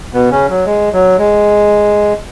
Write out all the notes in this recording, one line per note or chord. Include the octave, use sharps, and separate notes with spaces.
B2 B3
C#3 C#4
F#3
G#3
F#3
G#3